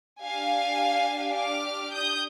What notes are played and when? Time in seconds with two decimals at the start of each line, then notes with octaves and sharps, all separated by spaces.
0.22 D4 G4 F5 G#5
1.35 D6 F6
1.94 D#6 G6